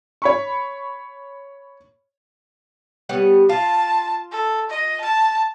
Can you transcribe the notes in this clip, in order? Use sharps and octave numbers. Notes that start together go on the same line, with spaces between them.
C#5 B5 C#6
G3 B3 C#5
F4 A5
A4
D#5
A5